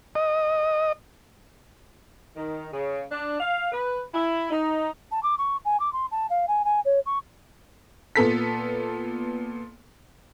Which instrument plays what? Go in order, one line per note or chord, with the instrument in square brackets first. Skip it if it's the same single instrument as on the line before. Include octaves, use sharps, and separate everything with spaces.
[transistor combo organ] D#5
[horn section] D#3
C#3
D4
F5
B4
E4
D#4
[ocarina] A5
D6
C#6
G#5
D6
C6
A5
F5
G#5
G#5
C#5
C#6
[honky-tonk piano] A#2 B3 A4 B6